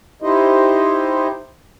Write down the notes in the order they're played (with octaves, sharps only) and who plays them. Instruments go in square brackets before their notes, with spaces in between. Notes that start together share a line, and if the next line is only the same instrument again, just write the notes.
[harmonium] D#4 E4 G4 C5 D#5